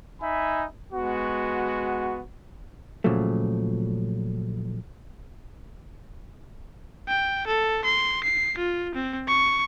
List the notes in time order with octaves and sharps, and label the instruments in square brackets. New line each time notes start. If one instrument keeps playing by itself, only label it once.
[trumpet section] D#4 E5 G#5 B5
G#3 B3 F#4
[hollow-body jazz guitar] A#2 C#3 F3 F#3 A3
[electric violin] G5
A4
C6
C7
F4
C4
C#6